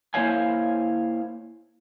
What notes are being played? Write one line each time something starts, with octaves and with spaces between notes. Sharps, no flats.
A#3 E4 C5 C#5 F5 G#5